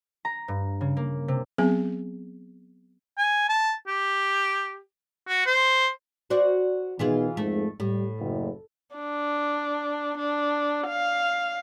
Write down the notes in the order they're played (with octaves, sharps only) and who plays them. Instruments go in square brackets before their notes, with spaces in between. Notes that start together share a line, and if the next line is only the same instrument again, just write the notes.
[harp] A#5
G2
C#3
A#3
C3
[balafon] F#3 B3 C4 G#4 G#5
[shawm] G#5
A5
G4
F#4
C5
[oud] F#4 C5 D5
[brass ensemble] B2 D#3 [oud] E3 F4 G#4
[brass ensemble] G#1 F2 G#2 [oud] A3
[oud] A2 [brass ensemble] G3
[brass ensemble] F#1
[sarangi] D4
D4
F5